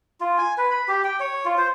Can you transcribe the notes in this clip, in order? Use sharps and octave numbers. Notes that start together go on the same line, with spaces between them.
F4
G#5
B4
B5
G4
G5
C#5
F4
C5